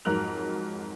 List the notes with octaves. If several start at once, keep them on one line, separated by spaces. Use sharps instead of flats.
F2 G#2 F#3 A#4 F#6 F7